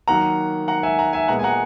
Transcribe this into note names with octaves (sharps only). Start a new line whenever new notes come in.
D#3 F#3 A#3 F#5 A#5
F#5 A#5
E5 G#5
F#5 A#5
E5 G#5
A#2 G#3 B3 F#5 A#5
G#5
F#5 A#5